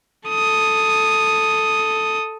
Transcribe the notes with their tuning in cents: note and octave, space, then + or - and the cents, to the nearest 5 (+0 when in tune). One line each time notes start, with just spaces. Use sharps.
A4 +0 D#6 +0